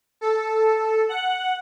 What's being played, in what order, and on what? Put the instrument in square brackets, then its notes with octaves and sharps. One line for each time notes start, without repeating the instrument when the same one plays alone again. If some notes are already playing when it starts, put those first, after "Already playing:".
[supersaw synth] A4
F#5